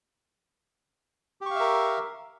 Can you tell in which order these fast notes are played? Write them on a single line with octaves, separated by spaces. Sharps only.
G4 C#6 F5 E5 A#4